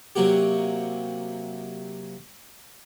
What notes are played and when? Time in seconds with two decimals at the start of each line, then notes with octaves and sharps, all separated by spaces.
0.15 C3 F#3 A#3 F#4 G4